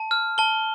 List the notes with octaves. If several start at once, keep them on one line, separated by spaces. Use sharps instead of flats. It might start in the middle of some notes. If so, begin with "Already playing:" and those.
Already playing: A5
F6
A5 G7